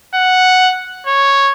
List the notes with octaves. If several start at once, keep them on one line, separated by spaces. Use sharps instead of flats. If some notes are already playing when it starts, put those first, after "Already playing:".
F#5
C#5